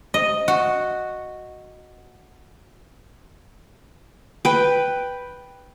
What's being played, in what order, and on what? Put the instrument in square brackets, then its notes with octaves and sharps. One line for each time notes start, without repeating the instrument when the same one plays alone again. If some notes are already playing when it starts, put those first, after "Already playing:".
[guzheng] D#5
F#4
[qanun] B4 G5